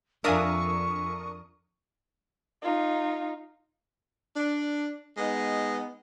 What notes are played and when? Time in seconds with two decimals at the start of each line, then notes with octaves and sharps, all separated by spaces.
0.24 F2 D4 A#4 E5 F5 G#5 C#6 D#6
2.62 D#4 F4
4.36 D4
5.17 G#3 B3 D#4